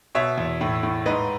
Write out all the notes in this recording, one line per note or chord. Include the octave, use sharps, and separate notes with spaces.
B2 C#5 E5
E2
A2
A2
G#2 B4 D#5